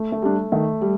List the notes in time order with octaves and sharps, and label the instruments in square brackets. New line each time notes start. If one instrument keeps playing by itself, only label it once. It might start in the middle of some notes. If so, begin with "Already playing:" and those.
Already playing: [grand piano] A3
A3
[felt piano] G3 D4
[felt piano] D#3 [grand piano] A3
[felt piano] G3